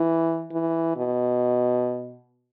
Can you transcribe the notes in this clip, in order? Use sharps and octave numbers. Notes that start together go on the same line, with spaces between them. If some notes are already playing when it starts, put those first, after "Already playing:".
Already playing: E3
E3
B2